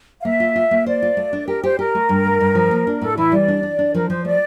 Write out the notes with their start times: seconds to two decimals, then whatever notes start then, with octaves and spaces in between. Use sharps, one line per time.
0.20 F5
0.25 A#3 E5
0.40 F4
0.56 F4
0.71 A#3
0.86 C5 D5
1.02 F4
1.17 A3
1.33 D4
1.48 G4 A#4
1.63 G4 C5
1.79 G4 A#4
1.95 A3
2.09 G2
2.25 A3
2.40 G2
2.55 F3
2.71 A#3
2.87 D4
3.01 A2 A4
3.17 E3 E4
3.32 G3 D5
3.48 D4
3.63 D4
3.79 D4
3.94 F3 A#4
4.09 F3 C5
4.25 A3 D5